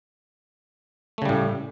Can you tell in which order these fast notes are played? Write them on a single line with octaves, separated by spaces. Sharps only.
A3 C#3 G3 A2